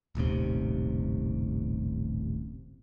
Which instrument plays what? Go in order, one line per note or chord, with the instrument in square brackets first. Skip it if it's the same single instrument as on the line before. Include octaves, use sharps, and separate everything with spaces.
[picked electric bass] D#1 A1 D#2 C3